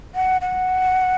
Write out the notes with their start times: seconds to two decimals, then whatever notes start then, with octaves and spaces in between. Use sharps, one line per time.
0.15 F#5
0.41 F#5